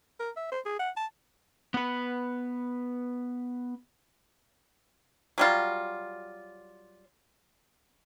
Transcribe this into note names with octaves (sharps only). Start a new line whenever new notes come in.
A#4
E5
C5
G#4
F#5
A5
B3 B4
F#3 G3 F4